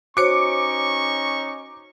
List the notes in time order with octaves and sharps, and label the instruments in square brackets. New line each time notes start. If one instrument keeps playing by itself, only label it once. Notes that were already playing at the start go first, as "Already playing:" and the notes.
[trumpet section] C#4 D#4 C#6 [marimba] F#4 C5 C#5 [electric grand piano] D6 C#7